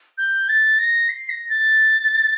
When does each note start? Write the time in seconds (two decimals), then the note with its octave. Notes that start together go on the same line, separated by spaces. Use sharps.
0.18 G6
0.49 A6
0.79 A#6
1.09 C7
1.30 A#6
1.50 A6